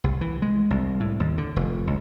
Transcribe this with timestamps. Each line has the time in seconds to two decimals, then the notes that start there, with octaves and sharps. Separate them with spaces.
0.04 C2
0.21 E3
0.42 G#3
0.70 C2
1.00 A2
1.20 D#2
1.38 D3
1.56 F1
1.87 C#2